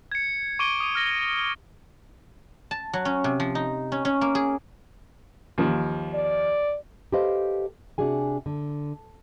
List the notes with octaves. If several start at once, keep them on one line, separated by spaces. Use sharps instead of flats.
G#6 C#7
C#6 D6 D7 D#7 G7
D#6 D#7
F6 A#6 G7
A5
F#3
C#4
C3
F3
D#4
C#4
C#4
A#3
G#4
D#2 F3
D5
G4 A4 B4 C5 D#5 F5
C3 D4 F#4 G#4 G#5
D3